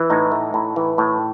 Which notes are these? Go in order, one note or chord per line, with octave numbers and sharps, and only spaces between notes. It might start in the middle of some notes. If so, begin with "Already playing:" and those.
Already playing: E3
A2 D#4
A3
A2
E3
A2